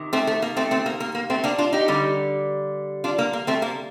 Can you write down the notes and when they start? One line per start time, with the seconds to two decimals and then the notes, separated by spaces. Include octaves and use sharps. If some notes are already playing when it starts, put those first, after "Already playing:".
Already playing: C3 D#3
0.13 A3 C4
0.27 A3
0.42 A#3
0.56 A3 C4
0.71 A3 C4
0.86 A#3
1.00 A#3
1.15 A#3
1.30 A3 C4
1.44 A#3 D4
1.58 D4 F4
1.73 D#4 G4
1.88 D3 G3
3.04 D4 F4
3.18 A#3
3.33 A#3
3.47 A3 C4
3.62 A#3